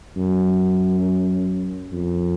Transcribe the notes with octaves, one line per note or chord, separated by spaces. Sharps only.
F#2
F2